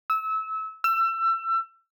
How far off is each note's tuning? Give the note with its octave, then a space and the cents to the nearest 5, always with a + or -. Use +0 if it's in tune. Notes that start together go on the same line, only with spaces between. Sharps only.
E6 -25
E6 +30